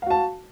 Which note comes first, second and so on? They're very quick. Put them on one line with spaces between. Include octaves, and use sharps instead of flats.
F5 F#4 A5